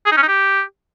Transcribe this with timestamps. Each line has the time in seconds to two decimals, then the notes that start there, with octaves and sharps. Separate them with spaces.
0.06 G#4
0.11 D#4
0.17 C#4
0.23 D#4
0.28 G4